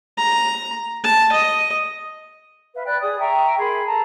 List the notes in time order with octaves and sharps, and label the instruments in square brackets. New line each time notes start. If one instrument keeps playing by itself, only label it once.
[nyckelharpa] A#5
A5
D#5
[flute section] B4 E5 F5
D5 G5 B5 F#6
G#4 D5 D#6
E5 G5 A#5 C#6
G#4 A#4 B5 C6
A4 A5 A#5